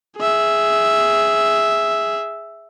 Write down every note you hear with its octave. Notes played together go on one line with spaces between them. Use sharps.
G#4 E5